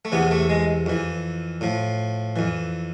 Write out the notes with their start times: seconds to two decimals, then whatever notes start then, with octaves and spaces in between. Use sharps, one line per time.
0.05 A3
0.12 E2 C3 E3 B3
0.31 A3
0.50 G#3
0.86 F2 E3
1.61 A2 F3
2.36 F2 E3